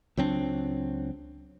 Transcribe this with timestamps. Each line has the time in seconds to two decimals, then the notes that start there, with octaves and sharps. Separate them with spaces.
0.17 C#2 F#3 C4 D4